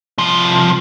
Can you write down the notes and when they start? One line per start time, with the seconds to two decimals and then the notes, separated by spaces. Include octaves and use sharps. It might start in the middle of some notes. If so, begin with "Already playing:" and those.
0.18 C2 F3